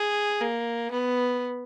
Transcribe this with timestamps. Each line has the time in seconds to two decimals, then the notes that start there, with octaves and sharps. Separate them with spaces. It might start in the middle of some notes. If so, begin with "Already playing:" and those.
Already playing: G#4
0.41 A#3
0.91 B3